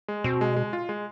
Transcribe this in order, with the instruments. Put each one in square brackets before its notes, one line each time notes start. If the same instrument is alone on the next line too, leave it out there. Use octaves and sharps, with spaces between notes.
[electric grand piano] G#3
[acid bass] B2 [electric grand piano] C4
[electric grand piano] G#3
G#3
F4
G#3